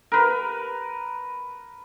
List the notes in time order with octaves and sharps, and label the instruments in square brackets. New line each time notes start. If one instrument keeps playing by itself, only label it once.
[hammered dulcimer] A#4 B4